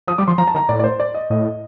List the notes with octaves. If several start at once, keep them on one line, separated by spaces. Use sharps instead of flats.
F3 D#6
G3 D6
F3 C6
F3 A#5
A5
D#3 A#5
A2 D5
D5
C5
D5
D#5
A2 D#5